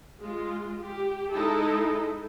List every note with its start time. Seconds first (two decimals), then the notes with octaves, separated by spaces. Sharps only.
0.20 G#3 F4
0.81 G4
1.33 G#3 D#4 E4 A4